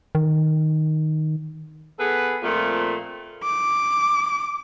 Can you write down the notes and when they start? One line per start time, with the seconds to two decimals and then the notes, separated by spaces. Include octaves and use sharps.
0.15 D#3
1.99 B3 G#4 A4 B4
2.43 A#2 F3 A3 C4
3.43 D6